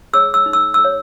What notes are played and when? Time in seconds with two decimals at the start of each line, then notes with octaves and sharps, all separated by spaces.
0.13 G#4 C#5 E6
0.34 E6
0.46 D#4
0.53 E6
0.74 G#4 E6
0.84 C#5